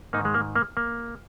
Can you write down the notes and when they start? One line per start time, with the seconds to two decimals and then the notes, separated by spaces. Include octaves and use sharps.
0.13 G#2 A#3 D#4
0.18 D#3
0.25 G#3
0.34 A#3
0.56 A#3
0.77 A#3